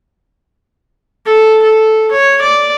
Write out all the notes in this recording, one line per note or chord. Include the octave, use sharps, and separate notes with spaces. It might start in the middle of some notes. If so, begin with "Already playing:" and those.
A4
A4
C#5
D5